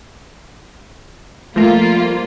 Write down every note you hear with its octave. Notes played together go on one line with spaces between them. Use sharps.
F3 G3 A3 A#3 F4 A#4